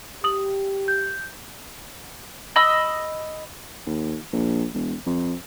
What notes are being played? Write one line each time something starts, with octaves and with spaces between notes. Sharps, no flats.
G4 D#6 F#7
G6
D#5 B5 E6
D#2
A#1
E1
F2